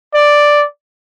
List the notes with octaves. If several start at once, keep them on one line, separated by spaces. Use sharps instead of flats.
D5